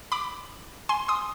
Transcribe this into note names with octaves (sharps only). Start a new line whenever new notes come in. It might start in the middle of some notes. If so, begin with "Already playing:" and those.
B5 D6
G#5 C6
C6 D#6